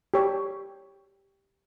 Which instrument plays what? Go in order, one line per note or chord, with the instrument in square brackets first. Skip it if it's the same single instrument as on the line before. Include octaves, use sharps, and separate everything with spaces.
[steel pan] G4 C#5